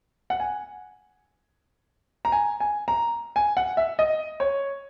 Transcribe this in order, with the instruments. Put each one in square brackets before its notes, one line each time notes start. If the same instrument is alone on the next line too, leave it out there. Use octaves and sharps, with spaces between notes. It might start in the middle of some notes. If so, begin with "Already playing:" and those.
[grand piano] F#5
G#5
A#5
G#5
G#5
A#5
G#5
F#5
E5
D#5
C#5